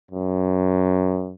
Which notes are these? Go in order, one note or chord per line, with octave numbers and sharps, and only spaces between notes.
F#2